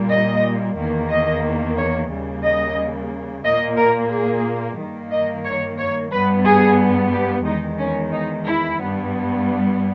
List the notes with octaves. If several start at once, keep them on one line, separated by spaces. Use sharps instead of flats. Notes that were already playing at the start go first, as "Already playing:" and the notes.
Already playing: A#2 G3 A#3
D#5
E2 D#3 A#3
D#5
C#5
D#2 C#3 G3 A#3
D#5
A#2 A#3 D#5
A#4
G#4
G2 D#3 A#3
D#5
C#5
C#5
G2 G3 B3 B4
G#4
G4
E2 D#3 G#3 D#4
C#4
D#4
E4
G2 G3 B3